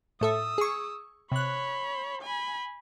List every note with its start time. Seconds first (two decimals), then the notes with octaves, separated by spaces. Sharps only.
0.21 A2 A4 E5 D#6 E6
0.58 G#4 C#6
1.32 C3 C#5 B5 F#6
2.22 G#5 B5